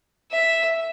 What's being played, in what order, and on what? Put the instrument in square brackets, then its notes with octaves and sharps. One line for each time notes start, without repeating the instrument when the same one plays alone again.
[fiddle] E5